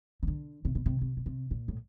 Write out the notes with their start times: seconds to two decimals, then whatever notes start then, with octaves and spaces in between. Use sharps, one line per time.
0.23 C#3
0.27 D3
0.65 C3
0.75 B2
0.86 C3
1.01 C3
1.17 B2
1.26 C3
1.51 A#2
1.68 A2